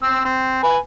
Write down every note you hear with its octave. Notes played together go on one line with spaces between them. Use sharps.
C4 E6
C4
B4 G#5